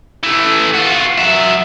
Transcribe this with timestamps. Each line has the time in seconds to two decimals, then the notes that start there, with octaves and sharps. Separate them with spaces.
0.23 E3 A3
0.74 F4 F#4
1.18 F#3 E5